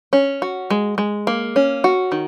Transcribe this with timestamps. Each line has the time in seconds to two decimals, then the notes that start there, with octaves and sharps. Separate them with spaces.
0.13 C#4
0.42 F#4
0.70 G#3
0.98 G#3
1.27 A#3
1.56 C#4
1.84 F#4
2.12 D#3